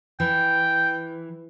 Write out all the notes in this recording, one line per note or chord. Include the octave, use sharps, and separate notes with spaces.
E3 G5